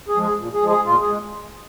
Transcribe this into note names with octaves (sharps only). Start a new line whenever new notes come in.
G#4
F3 G#3
G#4
A#2
G#4
F3 G#3
G#4
A#2 F4
G#4
G#3